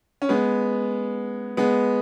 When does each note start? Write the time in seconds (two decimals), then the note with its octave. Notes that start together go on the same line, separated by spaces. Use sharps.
0.22 C#4
0.29 G#3 B3
1.57 G#3 B3